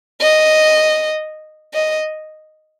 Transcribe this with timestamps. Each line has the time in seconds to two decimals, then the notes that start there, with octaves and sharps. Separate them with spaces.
0.21 D#5
1.74 D#5